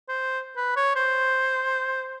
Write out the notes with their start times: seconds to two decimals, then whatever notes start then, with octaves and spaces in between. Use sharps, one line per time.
0.09 C5
0.57 B4
0.76 C#5
0.96 C5